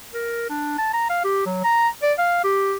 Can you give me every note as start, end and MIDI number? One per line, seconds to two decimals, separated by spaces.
0.14 0.47 70
0.50 0.77 62
0.78 0.90 81
0.94 1.09 82
1.10 1.23 77
1.24 1.44 67
1.46 1.61 54
1.64 1.89 82
2.03 2.13 74
2.18 2.44 77
2.44 2.77 67